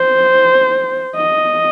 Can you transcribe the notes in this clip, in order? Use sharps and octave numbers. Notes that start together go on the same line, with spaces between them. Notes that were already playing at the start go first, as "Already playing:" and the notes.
Already playing: C5
D#5